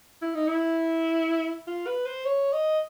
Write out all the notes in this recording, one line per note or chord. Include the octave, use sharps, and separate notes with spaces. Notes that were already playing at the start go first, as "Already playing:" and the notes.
E4
D#4
E4
F4
B4
C5
C#5
D#5